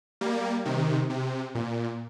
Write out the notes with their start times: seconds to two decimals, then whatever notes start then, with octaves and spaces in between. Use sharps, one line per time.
0.21 G3 A#3
0.65 C3 D#3
1.10 C3
1.55 A#2